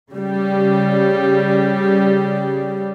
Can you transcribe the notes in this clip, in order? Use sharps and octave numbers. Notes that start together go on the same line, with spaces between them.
C#3 G3